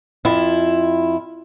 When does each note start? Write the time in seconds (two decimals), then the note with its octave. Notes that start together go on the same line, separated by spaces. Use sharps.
0.25 F2 E4 F4